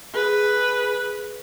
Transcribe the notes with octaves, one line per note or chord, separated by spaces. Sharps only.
G#4 B4